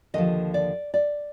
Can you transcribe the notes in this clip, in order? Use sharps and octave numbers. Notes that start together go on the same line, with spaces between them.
D#2 D3 F3 D#5
D5
D5